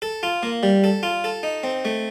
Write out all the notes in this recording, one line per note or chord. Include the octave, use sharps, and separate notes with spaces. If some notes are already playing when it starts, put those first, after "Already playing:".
A4
F4
A#3
G3
A4
F4
A4
D#4
C4
A3